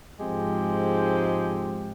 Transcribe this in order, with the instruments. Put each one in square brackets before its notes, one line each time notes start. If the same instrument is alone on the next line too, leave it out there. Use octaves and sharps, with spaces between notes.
[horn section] G#2 F3 G#3 C4 G4